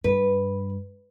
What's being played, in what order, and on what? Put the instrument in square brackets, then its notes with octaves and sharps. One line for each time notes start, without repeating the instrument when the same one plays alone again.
[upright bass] G2 [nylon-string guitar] B4